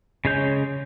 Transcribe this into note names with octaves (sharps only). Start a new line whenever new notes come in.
C#3 G#3 G#4 C#5 G6